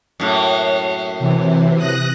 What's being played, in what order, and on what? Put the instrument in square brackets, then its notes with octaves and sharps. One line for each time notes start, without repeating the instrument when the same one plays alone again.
[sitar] F#2 A2 A#3
[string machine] C3 E3
D#6 F#6 A#6